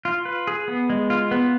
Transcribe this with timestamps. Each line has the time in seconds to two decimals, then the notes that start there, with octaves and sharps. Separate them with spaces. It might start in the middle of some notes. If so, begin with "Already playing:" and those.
0.05 F4
0.25 B4
0.47 G#4
0.68 B3
0.90 G#3
1.10 F4
1.31 B3